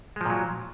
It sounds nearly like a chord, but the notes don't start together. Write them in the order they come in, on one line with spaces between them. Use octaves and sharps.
G#3 F3 A#2 F#3